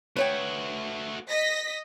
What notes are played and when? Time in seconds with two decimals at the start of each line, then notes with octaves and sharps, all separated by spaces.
0.16 A3 F#4 B4 C#5 G5
1.29 D#5 A#6 B6